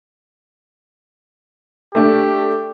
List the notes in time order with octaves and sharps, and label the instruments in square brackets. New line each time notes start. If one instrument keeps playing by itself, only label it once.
[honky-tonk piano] A3 D4 [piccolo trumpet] G4